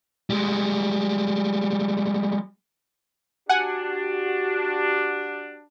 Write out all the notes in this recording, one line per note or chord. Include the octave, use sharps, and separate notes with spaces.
G3 G#3
D4 F#4 G4 F#5 G#5